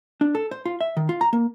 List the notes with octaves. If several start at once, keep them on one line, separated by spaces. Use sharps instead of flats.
D4
A4
C5
F4
E5
D#3
F4
A#5
A#3